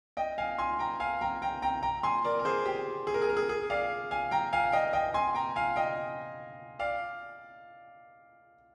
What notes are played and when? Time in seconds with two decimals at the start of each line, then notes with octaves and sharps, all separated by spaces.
0.17 D#5 G5
0.38 F5 G#5
0.58 G#5 C6
0.79 G5 A#5
1.00 F5 G#5
1.21 G5 A#5
1.42 G5 A#5
1.62 G5 A#5
1.83 G5 A#5
2.03 G#5 C6
2.24 A#4 D5
2.39 A#4
2.45 G#4 C5
2.65 G4
3.07 G#4
3.14 A#4
3.22 G#4
3.29 A#4
3.37 G#4
3.49 G#4
3.70 D5 F5
4.11 F5 G#5
4.31 G5 A#5
4.53 F5 G#5
4.72 D#5 G5
4.93 D#5 G5
5.14 G#5 C6
5.35 G5 A#5
5.56 F5 G#5
5.76 D#5 G5
6.79 D5 F5